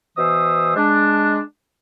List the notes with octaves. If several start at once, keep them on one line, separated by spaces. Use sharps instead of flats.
B2 E3 C5 E5 D#6
G#3 D4